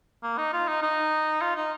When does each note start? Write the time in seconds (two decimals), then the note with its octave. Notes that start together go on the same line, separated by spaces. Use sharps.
0.23 A#3
0.38 D#4
0.53 F4
0.68 D#4
0.82 D#4
1.42 F4
1.56 D#4